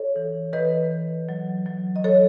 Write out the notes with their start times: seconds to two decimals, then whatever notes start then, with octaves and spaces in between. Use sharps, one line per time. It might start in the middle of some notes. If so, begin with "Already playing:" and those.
Already playing: A4 C#5
0.16 E3
0.53 E3 B4 D#5
0.91 E3
1.29 F#3
1.66 F#3
1.96 D#5
2.04 F#3 A4 C#5